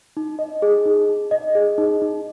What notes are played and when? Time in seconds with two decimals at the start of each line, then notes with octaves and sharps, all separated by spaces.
0.17 D#4
0.39 D#5
0.62 G#4
0.85 D#4
1.09 D#4
1.31 D#5
1.55 G#4
1.78 D#4
2.02 D#4